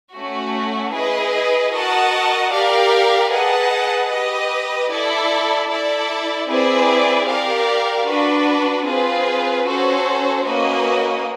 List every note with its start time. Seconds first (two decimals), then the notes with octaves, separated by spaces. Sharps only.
0.14 A3 C#4 F#4
0.93 E4 G#4 B4 D#5
1.72 F#4 A#4 D#5 F#5 A5
2.51 G4 A#4 D5 F5
3.31 G#4 B4 D#5 F#5 A5
4.10 G4 B4 D#5
4.90 E4 A4 D5
5.69 E4 A4 D5
6.49 C4 E4 G#4 B4 D5
7.27 G4 A#4 D5 F5
8.07 D4 F#4 B4
8.86 C4 F4 G#4 B4
9.66 C#4 F#4 A4 C5
10.44 A#3 C#4 F#4 B4 D#5